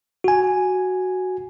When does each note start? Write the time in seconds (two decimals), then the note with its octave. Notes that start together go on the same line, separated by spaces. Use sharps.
0.24 F#4 G#5